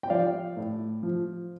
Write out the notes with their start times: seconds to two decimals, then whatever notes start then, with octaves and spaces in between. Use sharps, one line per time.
0.03 G5
0.10 F3 D5 F5
0.57 A2
1.03 F3